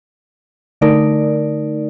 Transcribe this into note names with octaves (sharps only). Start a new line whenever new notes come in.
D3 A3 D#4 A#4 D5